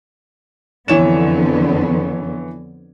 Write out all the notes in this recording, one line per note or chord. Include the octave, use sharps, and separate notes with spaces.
F2 D3 E3 B3 C#5 E7